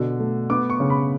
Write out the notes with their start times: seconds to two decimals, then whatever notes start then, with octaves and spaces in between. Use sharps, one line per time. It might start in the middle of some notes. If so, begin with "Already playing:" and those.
Already playing: B2 D3
0.20 A3
0.50 B3 D6
0.70 C#6
0.80 C#3
0.90 B5